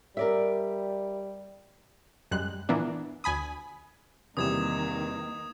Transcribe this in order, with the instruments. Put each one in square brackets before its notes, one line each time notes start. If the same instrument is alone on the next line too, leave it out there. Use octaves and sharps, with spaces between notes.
[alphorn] G3 [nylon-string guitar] A#4 D5 E5
[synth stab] F#2 G3 G#3 F#6
A#2 E3 A#3 B3 D4
D2 G#5 B5 D#6
[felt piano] E2 C3 G3 [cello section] D#3 A#3 [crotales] D#6 G#6 E7